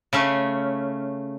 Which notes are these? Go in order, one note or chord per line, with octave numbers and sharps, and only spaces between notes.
C#3 A3 C#4